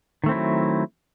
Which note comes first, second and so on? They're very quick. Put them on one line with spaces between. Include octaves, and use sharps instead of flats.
D#3 A3 C4 E4 F#3